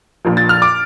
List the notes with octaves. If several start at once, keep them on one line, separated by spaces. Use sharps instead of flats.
A#1 A#2 F3
A6
F6
D6